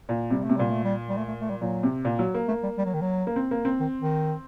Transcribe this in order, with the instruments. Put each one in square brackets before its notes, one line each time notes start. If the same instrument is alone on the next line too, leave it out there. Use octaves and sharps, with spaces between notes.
[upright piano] A#2
[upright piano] C3 [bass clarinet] G3
[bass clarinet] A3
[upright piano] C3
[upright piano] A#2 [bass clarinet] G3
[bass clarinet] A3
G3
G3
A3
A3
A3
G3
[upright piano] A#2 [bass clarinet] F#3
[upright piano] C3
A#2
F#3
A#3
[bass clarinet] A3 [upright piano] A#3
[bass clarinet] G3
G3
F#3
D#3
F#3
[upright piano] A#3
C4
A#3
C4
[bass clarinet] D#3
D#3